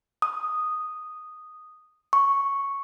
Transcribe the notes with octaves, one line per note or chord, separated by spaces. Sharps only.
D#6
C#6